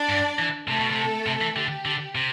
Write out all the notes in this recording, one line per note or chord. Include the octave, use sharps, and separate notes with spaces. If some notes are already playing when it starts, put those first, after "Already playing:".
Already playing: D4 D5
G2
E3
C3 A3 A4
B2
C3
C3
E3
D3 G4
D3
C3